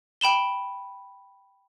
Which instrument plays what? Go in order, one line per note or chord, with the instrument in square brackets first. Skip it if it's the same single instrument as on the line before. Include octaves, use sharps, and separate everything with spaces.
[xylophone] G5 B5 E7 G7